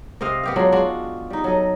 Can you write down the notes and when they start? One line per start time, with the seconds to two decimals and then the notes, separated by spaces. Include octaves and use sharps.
0.21 C3 C4 D#5 F5
0.43 B3 G4 F5
0.56 F#3 G#3 D4 F4
0.72 G#3 D4 F4 F#4
1.30 G3 D#4
1.44 F#3 A4 D#5